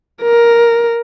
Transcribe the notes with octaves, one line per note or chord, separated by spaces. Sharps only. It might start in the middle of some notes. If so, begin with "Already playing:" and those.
A#4